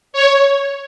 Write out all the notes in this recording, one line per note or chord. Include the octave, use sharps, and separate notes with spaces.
C#5